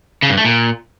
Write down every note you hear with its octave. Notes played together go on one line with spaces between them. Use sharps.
C#3
G2
A3
A#2